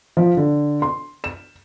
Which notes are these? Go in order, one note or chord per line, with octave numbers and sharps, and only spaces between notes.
F3
D3
C6
E7